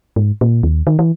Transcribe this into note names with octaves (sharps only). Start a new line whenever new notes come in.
G#2
A#2
D#2
D#3
E3